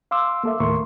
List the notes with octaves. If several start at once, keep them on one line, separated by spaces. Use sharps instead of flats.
F5 C6 D6 E6
A#3 A4 E5
D#2 A2 A3 A#4 C6 C#6